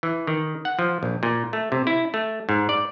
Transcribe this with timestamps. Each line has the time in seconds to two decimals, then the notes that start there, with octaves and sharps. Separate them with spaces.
0.03 E3
0.27 D#3
0.65 F#5
0.79 F3
1.03 A#1
1.23 A#2
1.53 A3
1.72 C3
1.87 E4
2.14 A3
2.49 G#2
2.69 D5